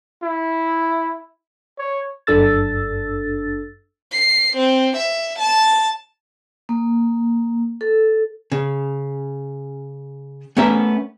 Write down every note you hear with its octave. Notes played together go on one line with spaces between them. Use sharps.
E4
C#5
G1 F#2 D4 A4 E6 A6
C7
C4
E5
A5
A#3
A4
C#3
A3 B3 C#4 A#4 C#5 E5